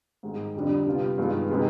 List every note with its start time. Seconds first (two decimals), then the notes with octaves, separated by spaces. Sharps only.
0.23 G#2 D#3 G#3
0.55 F2 D3 G3 D4
0.86 C3 G3 B3 F4
1.17 G2 D#3 G#3 B3 F4
1.49 C3 D#3 G#3 B3